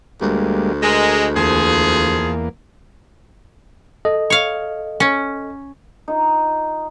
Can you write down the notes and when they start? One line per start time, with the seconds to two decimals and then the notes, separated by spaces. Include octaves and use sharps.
0.21 D2 G3 G#3 A#3
0.83 G#3 G#4 A#4
1.36 E2 F3 A#3 G#4
4.05 A4 D#5
4.30 C#5 F5
5.00 C#4
6.08 D#4 F4